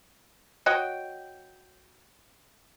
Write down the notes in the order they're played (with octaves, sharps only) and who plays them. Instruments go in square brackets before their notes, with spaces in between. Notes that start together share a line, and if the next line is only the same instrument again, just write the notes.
[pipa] F#4 C#5 D#5 G5